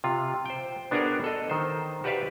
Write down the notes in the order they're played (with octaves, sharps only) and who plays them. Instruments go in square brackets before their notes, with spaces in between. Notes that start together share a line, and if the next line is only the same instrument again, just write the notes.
[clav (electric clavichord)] C3 F4
C5 G5
B3 D4 F#4 G#4 A#4 D5
A4 D#5
D#3 C5
F#4 G4 B4 D5 E5 F5